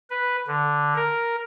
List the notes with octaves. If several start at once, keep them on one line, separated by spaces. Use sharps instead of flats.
B4
D3
A#4